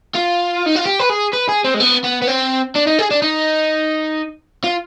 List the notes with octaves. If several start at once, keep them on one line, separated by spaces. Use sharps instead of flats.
F4
D#4
F4
G4
B4
G#4
B4
G#4
C4
G#3
B3
B3
B3
C4
D4
D#4
G#4
D4
D#4
F4